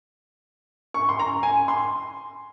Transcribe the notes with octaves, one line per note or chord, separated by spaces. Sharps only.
C#6
C6
A#5
G#5
C6